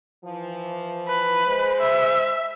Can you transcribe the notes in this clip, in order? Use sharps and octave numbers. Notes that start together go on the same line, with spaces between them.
E3 F3
B4
G#3 C5
E5